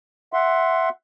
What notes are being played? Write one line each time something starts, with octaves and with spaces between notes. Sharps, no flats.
E5 F#5 C6